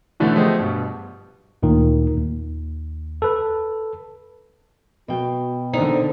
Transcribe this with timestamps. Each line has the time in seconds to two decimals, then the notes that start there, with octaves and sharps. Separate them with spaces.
0.20 B2 D3 E3 A3 B3 C#4
0.35 F3 A3 G4 G#4 C5 D#5
0.59 G2 B2
1.63 D2 A#2 D#3
2.17 D#2
3.22 A4 B4
5.08 B2 F#4 G5
5.73 A#2 D3 D#4 C5